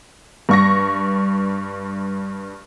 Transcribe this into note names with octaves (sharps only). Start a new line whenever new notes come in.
G2 C#6 A#6